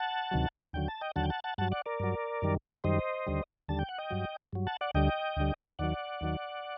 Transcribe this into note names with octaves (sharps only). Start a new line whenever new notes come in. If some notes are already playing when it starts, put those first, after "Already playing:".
Already playing: F#5 A5
D2 C3 D#3 F#3
D#2 D3 F#3 G5
A5
D#5 G5
D#2 D3 F#3 F#5 A5
G5
F#5 A5
F#5 A5
G2 F#3 F#5 A5
D5 F#5
A#4 D5
G2 F#3
F#2 D#3 G3
F#2 D#3 G3 C5 D#5
D#2 D3 G3
D#2 D3 G3 A5
G5
F#5
D#5 G5
G2 F#3
G2 F#3
F#5 A5
D5 F#5
D2 D3 G3 D#5 G5
D2 D3 G3
D#2 D#3 F#3 D5 F#5
D#2 D#3 F#3